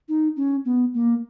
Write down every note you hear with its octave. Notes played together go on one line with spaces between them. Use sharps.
D#4
C#4
B3
A#3